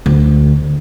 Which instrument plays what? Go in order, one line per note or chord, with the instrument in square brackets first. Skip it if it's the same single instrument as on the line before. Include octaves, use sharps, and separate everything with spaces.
[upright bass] D2